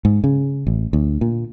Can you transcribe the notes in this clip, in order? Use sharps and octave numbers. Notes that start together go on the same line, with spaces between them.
G#2
C#3
A1
D2
A#2